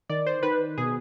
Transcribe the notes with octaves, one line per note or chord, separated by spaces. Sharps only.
D#3 D5
C5
D#3 B4
B2 G#4